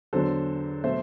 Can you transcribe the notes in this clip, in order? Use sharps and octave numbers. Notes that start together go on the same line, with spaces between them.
E2 D3 F#3 A4 C5
B2 F#3 A3 C5 E5